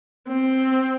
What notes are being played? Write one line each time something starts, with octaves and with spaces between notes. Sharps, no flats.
C4